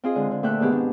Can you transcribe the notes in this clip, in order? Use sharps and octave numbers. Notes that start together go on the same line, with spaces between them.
C4 F4 G#4 D#5
D3 G#3
D3
A#2 A3 D4 E5 G5 F#6
G#2 B2 D#3 B3 G4 G#4
D4